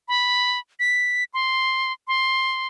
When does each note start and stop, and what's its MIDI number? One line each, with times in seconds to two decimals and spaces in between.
0.08 0.59 83
0.80 1.24 95
1.34 1.93 84
2.08 2.68 84